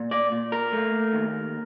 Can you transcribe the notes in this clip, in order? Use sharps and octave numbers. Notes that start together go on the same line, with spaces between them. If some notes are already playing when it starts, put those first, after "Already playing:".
Already playing: A#2
D5
A#2
A#4
A3
D#2